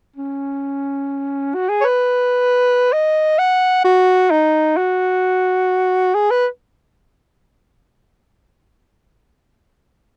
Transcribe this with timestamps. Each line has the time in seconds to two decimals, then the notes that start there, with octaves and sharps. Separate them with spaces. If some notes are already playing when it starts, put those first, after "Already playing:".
0.16 C#4
1.55 F#4
1.69 G#4
1.81 C#5
1.84 B4
2.93 D#5
3.38 F#5
3.84 F#4
4.31 D#4
4.77 F#4
6.15 G#4
6.31 B4